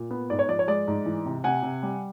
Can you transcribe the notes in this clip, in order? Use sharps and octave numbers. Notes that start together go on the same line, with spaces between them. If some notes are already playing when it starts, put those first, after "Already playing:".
Already playing: A#2
B3
G#2 D5
C#5
F3 D5
C#5
G#3 D5
G#2
E3
C3
C3 F#5 G#5
C3
G3